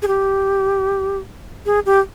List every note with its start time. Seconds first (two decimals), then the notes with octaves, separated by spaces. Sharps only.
0.02 G#4
0.07 G4
1.66 G#4
1.86 G4